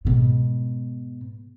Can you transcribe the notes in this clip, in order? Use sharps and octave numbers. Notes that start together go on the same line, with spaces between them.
G#2 B2